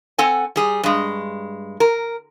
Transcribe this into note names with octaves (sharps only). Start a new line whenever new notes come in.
C4 A4 F#5 G#5
G3 G#4
G2 G#3
A#4